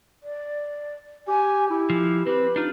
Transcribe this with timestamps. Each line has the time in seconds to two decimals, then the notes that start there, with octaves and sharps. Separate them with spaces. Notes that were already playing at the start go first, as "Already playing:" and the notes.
0.23 D5
1.28 G4 G#5
1.70 E4 G4
1.90 F3
2.27 C4 G4 B4
2.56 D4 D#4 F4